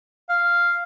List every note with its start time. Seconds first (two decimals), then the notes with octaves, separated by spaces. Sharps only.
0.29 F5